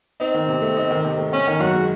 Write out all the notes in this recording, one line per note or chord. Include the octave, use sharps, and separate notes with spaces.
C4 D#4
D#3
C3
A3
D#4
D#3
C3
A3
C4 C#4
D#3
F#2 F#4
G#3